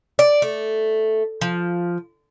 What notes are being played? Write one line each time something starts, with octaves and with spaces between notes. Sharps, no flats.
D5
A3
F3